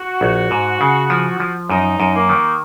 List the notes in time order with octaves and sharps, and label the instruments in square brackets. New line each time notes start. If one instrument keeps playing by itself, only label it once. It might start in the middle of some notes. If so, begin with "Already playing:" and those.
Already playing: [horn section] F#4
[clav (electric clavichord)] A#1
G#2
C#3
F3
F3
[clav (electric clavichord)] F#2 [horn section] D#4
[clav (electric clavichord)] F#2
[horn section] A#3
[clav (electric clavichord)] D#3